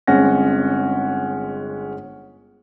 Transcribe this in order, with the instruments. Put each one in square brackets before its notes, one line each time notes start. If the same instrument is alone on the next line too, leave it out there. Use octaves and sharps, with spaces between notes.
[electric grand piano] G1 G#3 C4 C#4 F#5 A#6